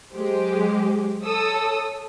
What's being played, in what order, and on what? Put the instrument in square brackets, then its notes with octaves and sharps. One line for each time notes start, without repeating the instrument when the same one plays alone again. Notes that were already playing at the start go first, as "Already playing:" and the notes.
[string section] F#3 G#3 G4 C5
A4 C#5 D#6 E6